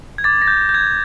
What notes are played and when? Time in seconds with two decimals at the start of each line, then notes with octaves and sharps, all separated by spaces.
0.18 G#6
0.24 D6 A6
0.42 A#6
0.48 G6
0.69 G6
0.74 G#6